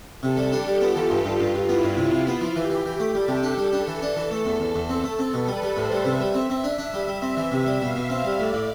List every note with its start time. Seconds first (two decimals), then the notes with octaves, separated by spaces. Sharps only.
0.23 C3 A4
0.37 G3
0.52 D4 G4
0.67 G3
0.81 B3 F4
0.96 E3
1.10 G2 F4
1.25 G2
1.39 G2 F4
1.54 G2
1.68 B3 E4
1.83 G2
1.97 C3 F4
2.12 C3
2.27 B3 F4
2.41 F3
2.56 E3 G4
2.70 E3
2.85 E3 G4
3.00 A3
3.15 G3 A4
3.28 C3
3.43 D4 A4
3.57 G3
3.73 D4
3.87 E3
4.02 D4
4.16 E3
4.31 A3
4.45 E2
4.60 E2
4.75 E2
4.89 C4 A4
5.04 A3
5.19 C4
5.34 B2
5.47 G3 B4
5.62 G3
5.77 A2 C5
5.91 G3
6.05 C3 E5
6.20 G3
6.34 C4
6.50 C4
6.64 D4 E5
6.78 D4
6.94 G3
7.08 G3
7.22 C4
7.37 E3
7.52 C3
7.67 G3
7.81 B2 F5
7.95 B2
8.10 C4 E5
8.25 G3
8.39 A2 D5
8.53 A2